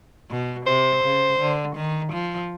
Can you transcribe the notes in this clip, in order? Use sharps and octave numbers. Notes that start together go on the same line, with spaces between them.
B2
C3 C5
C#3
D3
D#3
F3